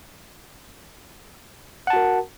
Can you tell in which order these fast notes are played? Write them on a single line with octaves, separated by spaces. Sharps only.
F#5 A5 F#4 A#4